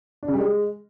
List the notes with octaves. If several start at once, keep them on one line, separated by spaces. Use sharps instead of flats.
D4
C#3
G3
G#3